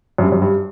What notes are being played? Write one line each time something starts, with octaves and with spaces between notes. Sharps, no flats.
F#2
G2
F#2
G2